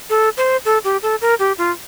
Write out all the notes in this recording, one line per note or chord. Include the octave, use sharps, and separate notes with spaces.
A4
C5
A4
G4
A4
A#4
G4
F4